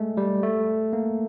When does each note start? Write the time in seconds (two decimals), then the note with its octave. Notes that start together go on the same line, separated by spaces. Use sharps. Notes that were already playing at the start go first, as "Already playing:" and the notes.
Already playing: G#3 A3
0.17 G3
0.43 A3
0.93 A#3